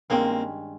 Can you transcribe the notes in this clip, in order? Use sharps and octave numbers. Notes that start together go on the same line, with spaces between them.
G2 D#3 G#3 A#3 C4 C#4